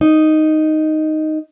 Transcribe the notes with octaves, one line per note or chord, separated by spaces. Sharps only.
D#4